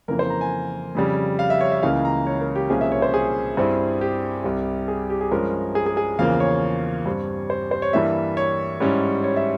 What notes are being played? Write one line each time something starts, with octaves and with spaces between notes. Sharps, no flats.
F2 C#3 E3 A#3 A#4
C5
A#5
G#5
F2 C#3 G3
F5
E5
C#5
E5
C#2 C#3 E3 A#3 C#4 F5
A#5
C#5
A#4
G4
C2 A#2 F3 A#3 C#4 G#4
E5
C#5
C5
G#4
G2 G3 C4 E4
G4
C2 C3 G3
G#4
G4
G#4
G2 F3 G#3 C#4 A#4
G#4
G#4
G#4
E2 C#3 F3 A#3 F5
C#5
G2 G3 C4
C5
C5
C#5
G2 E3 G3 A#3 E5
C#5
G#2 G3 C#4 E4
C#5
E5